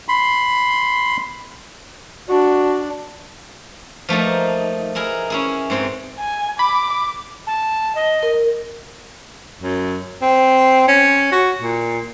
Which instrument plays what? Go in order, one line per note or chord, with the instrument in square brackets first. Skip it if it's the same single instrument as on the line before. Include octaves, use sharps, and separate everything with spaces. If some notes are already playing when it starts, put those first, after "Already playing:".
[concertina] B5 C6
[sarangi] D4 [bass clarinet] F#4
[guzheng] F3 A3 A#3 D#4
D#4 E4 G#4 A#4
C#4 E4 G#4
G#2 C4 G#4
[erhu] G#5
[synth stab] B5 [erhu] D6
[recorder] A5
D#5
[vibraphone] A#4
[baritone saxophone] F#2
C4
C#4
F#4
A#2